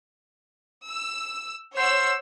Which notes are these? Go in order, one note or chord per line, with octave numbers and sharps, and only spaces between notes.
E6
C5 C#5 F#5 E6